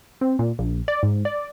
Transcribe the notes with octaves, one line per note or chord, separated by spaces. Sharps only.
C4
A#2
A#1
D5
G#2
D5